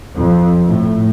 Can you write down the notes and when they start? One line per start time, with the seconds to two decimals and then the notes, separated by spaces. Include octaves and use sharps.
0.16 F2
0.66 A2